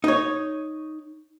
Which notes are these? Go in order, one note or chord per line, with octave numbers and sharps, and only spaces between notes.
D#4 C#5